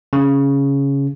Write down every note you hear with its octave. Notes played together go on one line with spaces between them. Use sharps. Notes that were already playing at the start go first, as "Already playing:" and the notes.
C#3